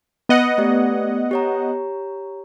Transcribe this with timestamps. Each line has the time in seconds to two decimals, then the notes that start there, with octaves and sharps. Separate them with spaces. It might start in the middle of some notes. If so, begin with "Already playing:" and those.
0.29 B3 D#5 F#5
0.58 A3 G4 D5
1.31 G4 C#5 A#5